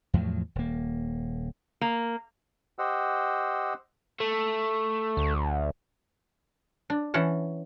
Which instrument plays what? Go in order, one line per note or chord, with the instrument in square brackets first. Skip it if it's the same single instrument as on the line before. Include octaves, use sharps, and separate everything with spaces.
[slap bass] E2 A2 F3 F#3
D#1 A#3
[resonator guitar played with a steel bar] A#3
[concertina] G4 C5 D#5 F#5 E6
[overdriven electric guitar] A3
[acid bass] D2
[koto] D4
E3 C#4 F#5 A5